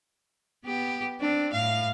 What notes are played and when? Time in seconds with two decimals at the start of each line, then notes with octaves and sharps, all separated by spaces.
0.65 B3 G4
1.20 C4 D4
1.53 A2 F5